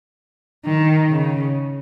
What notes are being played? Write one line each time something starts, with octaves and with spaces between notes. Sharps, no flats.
D#3
C#3